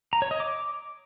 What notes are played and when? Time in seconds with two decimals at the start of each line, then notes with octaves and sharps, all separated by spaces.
0.13 A#5
0.22 C#5
0.31 D#5
0.40 D6